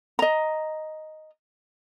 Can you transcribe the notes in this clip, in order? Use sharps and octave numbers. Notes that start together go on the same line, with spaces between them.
D#5 A#5